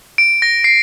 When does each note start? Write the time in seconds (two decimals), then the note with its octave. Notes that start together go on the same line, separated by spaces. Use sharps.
0.18 D7
0.42 A#6
0.64 C7